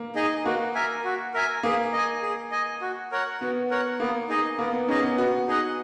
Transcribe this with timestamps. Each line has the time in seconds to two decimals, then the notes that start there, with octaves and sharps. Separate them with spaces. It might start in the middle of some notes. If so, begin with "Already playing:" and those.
Already playing: A#3
0.16 D#4 G#4 D#5
0.45 A#3 F#4
0.75 A#4 E5 G#5
1.05 F#4
1.34 A#4 E5 G#5
1.63 A#3 G#4
1.93 D#5 G#5
2.22 G#4
2.52 D#5 G#5
2.81 F#4
3.12 A#4 C#5 F#5
3.41 B3 F#4
3.70 A#4 C#5 F#5
4.00 A#3 B3
4.29 D#4 G#4 D#5
4.59 A#3 B3
4.73 B3
4.89 C#4 D#4 G#4 D#5
5.03 B3
5.18 B3 F#4
5.47 D#4 G#4 D#5 F#5